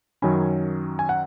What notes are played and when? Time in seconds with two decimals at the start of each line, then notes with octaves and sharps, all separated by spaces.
0.22 F#2 D#3 F#3 C#4 G#5 B5
0.99 G#5
1.09 F#5